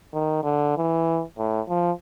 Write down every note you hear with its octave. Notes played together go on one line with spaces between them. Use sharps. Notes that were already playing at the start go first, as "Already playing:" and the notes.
D#3
D3
E3
A2
F3